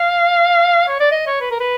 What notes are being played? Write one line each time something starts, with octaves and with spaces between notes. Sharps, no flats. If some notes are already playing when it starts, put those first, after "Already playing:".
Already playing: F5
C#5
D5
D#5
C#5
B4
A#4
B4